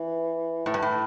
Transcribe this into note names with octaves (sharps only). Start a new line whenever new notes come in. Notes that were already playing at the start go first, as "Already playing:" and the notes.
Already playing: E3
A2 E3
G2
A2